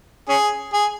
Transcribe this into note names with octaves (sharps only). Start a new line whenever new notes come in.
C#4 G#4
G#4